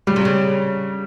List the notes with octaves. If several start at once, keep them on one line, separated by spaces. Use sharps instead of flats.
C#3 G3
C3
C#3